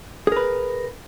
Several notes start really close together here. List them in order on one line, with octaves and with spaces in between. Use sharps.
G#4 A#4 B4